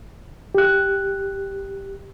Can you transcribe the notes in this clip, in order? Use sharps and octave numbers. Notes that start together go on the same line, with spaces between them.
G4 F#6